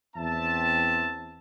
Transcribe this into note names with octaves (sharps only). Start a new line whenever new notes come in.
E2 C4 E5 A5